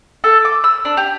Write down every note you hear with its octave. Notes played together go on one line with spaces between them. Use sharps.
A4
D6
E6
D4
G4